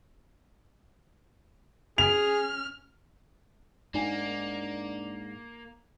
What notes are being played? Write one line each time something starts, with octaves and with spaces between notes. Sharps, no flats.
C#4 G#4 F6 F7
G#2 A#3 D4 D#4 G#5